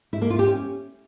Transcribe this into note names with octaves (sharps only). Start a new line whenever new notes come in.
E4
A#3
F4
G4
C#4